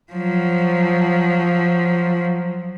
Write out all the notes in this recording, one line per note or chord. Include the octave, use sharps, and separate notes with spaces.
F3 F#3